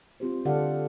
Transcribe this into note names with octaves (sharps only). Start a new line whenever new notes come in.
C4 F4 G4 C5
D3 G4 A4 D5 F5 F#5